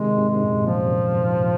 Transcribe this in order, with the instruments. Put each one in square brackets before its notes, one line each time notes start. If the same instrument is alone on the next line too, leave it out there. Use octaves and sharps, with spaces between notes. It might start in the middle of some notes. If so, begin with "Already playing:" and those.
Already playing: [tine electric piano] C3 D#3 [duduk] G#3
[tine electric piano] G#2 C3
[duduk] G#3
[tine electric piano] G#2
F#2 A#2
[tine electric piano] F#2 A#2 [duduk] F3